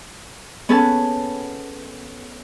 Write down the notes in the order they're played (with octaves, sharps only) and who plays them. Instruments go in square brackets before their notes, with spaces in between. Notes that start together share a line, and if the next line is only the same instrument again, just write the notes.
[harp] B3 C#4 G#4 A4 B4 A5